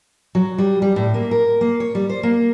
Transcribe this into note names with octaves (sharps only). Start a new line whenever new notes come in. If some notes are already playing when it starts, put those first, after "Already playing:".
F#3
G3
G3
A2
A#3
A#4
A#3
C#5
G3
C5
A#3